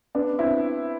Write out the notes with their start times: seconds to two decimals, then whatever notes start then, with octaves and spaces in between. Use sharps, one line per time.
0.15 B3 D4
0.39 C4 E4